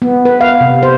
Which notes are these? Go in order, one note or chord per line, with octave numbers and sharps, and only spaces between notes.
B3
B4
F5
C3
C5